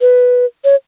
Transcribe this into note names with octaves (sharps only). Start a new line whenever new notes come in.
B4
C#5